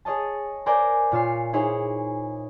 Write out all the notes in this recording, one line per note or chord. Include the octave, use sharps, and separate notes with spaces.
G#4 C#5 D#5 A5
A#4 C5 D5 G#5 G6
A#2 F4 C#5 E6 C7
D#4 E4 G#4 C5 C#5